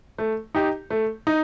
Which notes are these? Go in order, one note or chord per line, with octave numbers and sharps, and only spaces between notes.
A3
D#4 G4
A3
D#4